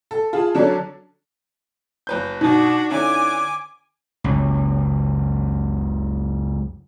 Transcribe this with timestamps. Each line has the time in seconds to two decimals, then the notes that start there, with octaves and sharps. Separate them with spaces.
0.11 A4
0.33 F4 G#4 A5
0.55 D3 F#3 C#4 D4 A4
2.07 F#1 B4 G6
2.41 B2 D4 D#4 F#4
2.91 D3 C#4 E4 G#5 D6
4.24 F#1 C#2